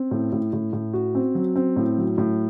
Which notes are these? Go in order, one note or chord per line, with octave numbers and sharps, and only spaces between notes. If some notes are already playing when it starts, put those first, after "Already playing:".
Already playing: C4
A2
A2
A2
A2
F#4
C4
F#3
C4
A2
F#3
A2